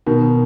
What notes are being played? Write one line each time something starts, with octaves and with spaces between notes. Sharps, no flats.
B2 D#3